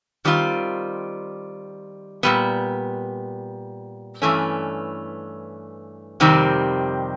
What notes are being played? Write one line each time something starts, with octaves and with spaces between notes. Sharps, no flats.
D#3 G3 C4 F4
A#2 G3 B3
G2 E3 A3 C#4
F2 C3 D#3 G3 C4